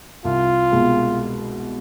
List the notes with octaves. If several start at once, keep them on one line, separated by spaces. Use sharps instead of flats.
C2 F4
B2 G#3 B3